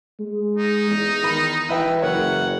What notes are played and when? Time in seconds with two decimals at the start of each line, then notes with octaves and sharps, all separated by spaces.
0.20 G#3
0.57 D#4
0.90 E2
1.23 D#3 B5
1.69 E3 B4 E5 G5
2.02 F#1 A#4 C#5 F#5